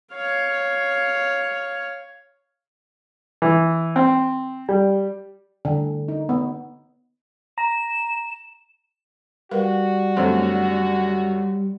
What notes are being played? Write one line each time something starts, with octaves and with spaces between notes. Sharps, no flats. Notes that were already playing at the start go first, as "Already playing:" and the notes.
C#5 F5
E3
C4
G3
D3
D#4
B3
A#5 E7
G3 F#4 A#4 B4 F5
F#2 D3 A3 C4 C5